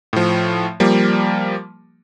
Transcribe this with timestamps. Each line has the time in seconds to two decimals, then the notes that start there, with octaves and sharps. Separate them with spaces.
0.13 A2 F3
0.80 F3 G3 A#3